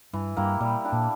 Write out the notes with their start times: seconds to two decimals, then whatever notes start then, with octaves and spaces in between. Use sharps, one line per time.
0.13 G2 E3
0.36 G2 A#3 E4 G4
0.60 A#2 G3
0.84 D4 G4
0.92 A#2